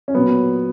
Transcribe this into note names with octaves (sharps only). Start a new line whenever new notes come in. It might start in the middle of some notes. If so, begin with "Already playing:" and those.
C#4
A#2 F#3 B3